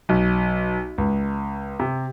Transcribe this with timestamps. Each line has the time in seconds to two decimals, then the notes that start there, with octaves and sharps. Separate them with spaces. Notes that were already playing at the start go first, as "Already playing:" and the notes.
0.09 B1
0.98 C#2
1.80 C3